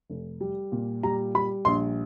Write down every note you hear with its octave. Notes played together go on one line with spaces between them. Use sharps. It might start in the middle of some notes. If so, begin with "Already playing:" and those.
F1
G3
A#2
G3 A#5
G3 B5
A#1 C6